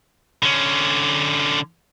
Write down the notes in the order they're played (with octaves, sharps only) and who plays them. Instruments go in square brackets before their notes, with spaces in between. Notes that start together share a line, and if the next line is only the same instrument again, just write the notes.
[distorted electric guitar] D3 C#4